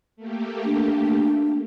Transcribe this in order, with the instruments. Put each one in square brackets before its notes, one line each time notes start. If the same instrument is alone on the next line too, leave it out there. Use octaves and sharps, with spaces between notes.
[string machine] A3 A#3 G4
[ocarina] D4